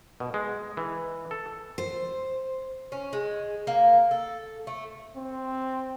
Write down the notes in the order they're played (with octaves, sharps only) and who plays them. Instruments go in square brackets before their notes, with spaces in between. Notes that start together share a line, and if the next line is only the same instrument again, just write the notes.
[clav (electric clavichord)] B2
G#3
E3
A4
[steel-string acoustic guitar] C5
[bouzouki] C#4
G#3
A#3
A4
A3
[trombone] C4